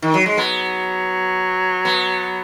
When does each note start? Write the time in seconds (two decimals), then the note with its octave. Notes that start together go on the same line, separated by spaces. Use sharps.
0.02 D#3
0.14 F#3
0.26 G#3
0.38 F#3 B3
1.85 B3